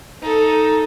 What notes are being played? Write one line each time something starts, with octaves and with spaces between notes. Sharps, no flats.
D#4 A4